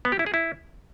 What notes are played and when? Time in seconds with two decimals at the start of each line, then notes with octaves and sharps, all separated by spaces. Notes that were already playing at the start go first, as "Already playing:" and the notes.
0.05 B3
0.12 G4
0.19 E4
0.26 G#4
0.34 E4